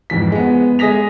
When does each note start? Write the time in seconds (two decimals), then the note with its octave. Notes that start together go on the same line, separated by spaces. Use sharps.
0.10 F2 G#2 E3 B6
0.32 G#3 B3
0.79 G#3 G#4 D#6 A#6 B6 F7